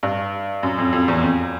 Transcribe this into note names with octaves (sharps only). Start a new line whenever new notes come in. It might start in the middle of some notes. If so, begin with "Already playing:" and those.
G2
F#2
F2
F2
E2
F2